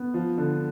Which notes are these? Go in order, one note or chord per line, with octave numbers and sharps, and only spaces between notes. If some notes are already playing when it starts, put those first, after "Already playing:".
Already playing: B3
F3
D3